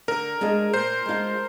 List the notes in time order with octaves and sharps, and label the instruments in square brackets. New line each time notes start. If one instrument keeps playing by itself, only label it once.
[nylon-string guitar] D3 [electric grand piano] A#4
[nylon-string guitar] G#3 D4 F4 G#4
[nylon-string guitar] A#2 [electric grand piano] C5
[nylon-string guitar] G#3 D4 F4